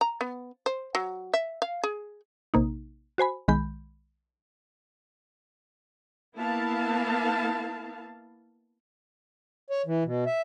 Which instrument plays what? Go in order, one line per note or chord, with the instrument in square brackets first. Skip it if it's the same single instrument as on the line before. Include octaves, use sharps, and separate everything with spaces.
[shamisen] A#5
B3
C5
F#3
E5
F5
G#4
[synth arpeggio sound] A#1 C3 A#3 D#4
F#4 C5 G#5 B5
B1 D#3 G#3 B5 G6
[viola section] A#3 B3 E4 F5 A5
[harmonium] C#5
E3
B2
E5